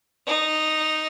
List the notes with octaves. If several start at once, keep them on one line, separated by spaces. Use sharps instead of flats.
D#4